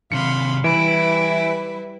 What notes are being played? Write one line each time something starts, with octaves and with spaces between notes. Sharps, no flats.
D#2 C3 F5 B5 C6 C#7
E3 G3 E4 B4 E5 B5 D7